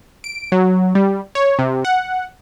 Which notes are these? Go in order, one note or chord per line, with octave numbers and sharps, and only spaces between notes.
D7
F#3
G3
C#5
C3
F#5